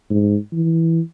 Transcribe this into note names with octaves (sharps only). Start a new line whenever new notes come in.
G#2
E3